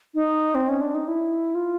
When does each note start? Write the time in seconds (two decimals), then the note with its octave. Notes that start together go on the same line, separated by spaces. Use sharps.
0.14 D#4
0.55 C4
0.69 C#4
0.81 D4
0.94 D#4
1.08 E4
1.55 F4